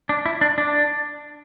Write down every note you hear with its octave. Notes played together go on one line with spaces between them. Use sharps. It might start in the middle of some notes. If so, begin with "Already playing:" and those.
D4
E4
D4
D4